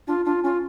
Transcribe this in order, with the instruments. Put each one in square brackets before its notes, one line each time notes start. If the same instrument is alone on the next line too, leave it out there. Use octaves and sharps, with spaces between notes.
[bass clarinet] D4 [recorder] F4
[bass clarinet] D4 [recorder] F4
[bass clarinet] C#4 [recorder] F4